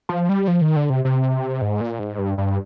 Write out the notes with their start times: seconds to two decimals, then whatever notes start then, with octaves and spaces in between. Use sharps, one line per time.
0.09 F3
0.29 G3
0.48 F3
0.61 D#3
0.76 D3
0.90 C3
1.05 C3
1.62 G#2
1.81 A#2
1.99 G#2
2.19 G2
2.38 G2